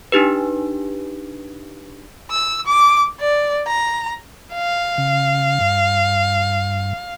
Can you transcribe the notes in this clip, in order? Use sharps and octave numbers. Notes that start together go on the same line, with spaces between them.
D4 D#4 G4 B4
E6
D6
D5
A#5
F5
C#3
G2